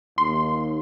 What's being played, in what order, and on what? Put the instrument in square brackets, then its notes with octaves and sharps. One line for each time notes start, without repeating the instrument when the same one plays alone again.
[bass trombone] D#2 [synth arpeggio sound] C6